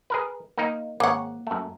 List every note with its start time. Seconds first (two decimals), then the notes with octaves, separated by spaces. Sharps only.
0.10 G#4 A#4 B4
0.58 A#3 D#4
1.00 G#1 A#3 G#4 C#5 F#5
1.47 F#2 A3